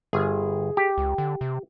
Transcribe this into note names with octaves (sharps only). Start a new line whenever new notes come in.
G1 G#4
G4
C#2
D3
C3